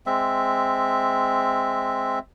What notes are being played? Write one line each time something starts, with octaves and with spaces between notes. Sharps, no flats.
G#3 C4 E5